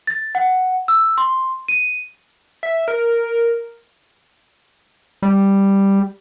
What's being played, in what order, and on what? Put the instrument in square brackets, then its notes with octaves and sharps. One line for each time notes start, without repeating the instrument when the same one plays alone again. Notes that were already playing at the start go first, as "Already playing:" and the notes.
[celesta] A6
F#5
E6
C6
D#7
[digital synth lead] E5
A#4
[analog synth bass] G3